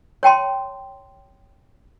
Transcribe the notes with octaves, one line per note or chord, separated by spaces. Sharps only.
C#5 G5 A5 C6